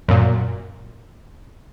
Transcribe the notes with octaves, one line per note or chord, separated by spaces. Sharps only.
F#2 A#2